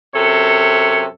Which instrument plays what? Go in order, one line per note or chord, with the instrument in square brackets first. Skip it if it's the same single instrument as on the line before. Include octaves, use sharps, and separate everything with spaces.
[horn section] F#2 C3 A4 C#5